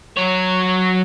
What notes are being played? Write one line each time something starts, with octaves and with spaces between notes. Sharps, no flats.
F#3 C#5